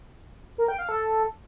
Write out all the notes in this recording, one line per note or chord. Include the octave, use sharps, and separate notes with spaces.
A#4
G5
F5
A4